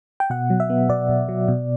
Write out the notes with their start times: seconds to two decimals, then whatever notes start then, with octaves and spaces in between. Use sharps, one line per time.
0.20 G5
0.30 B2 F#5
0.50 F#3
0.60 E5
0.70 B3
0.89 B2 D5
1.09 B2
1.29 F#3
1.48 B2